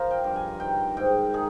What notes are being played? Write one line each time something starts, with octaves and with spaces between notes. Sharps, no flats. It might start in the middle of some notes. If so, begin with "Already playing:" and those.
Already playing: F3 A#4 C5
G5
G2
G#5
D#3 G5
G#2 G5
D#3 G#4